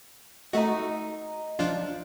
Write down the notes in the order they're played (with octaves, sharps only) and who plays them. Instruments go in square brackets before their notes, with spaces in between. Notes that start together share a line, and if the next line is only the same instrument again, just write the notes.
[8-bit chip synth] A3 F#4 [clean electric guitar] D#5 A#5
[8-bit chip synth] F3 D4 F4